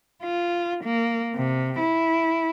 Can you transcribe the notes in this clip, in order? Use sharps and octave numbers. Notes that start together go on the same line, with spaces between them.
F4
A#3
C3
E4